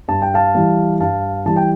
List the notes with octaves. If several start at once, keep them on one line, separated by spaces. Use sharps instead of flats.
G2 A5
G5
F5 A5
E3 G3
G2 F5 A5
E3 G3 A5
G5